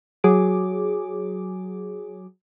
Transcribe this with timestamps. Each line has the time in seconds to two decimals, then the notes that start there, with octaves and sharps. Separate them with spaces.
0.24 F#3 G#4 D6